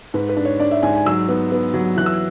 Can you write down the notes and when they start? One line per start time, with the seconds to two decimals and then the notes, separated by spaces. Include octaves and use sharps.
0.14 G#2 B4
0.29 B4
0.37 D4
0.45 C#5
0.60 D4 D5
0.71 E5
0.83 G#2 G#5
0.95 G#5
1.06 F#3 E6
1.29 B3
1.52 B3
1.74 F#3
1.97 E3 F#6
2.06 E6